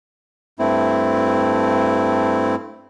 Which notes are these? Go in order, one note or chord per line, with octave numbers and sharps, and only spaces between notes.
G2 A3 C4 E4